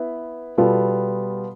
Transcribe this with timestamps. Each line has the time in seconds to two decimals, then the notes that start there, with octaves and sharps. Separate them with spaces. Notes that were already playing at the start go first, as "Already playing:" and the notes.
Already playing: B3 E4 B4
0.58 B2 G3 B3 F4 A4